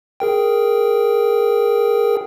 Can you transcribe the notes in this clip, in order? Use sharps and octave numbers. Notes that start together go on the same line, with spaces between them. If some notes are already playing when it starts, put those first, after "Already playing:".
G#4 A#4 G5